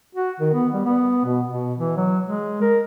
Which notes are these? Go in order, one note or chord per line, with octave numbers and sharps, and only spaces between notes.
F#4
D#3
B3
G3
B3
B2
B2
E3
F#3
G#3
A#4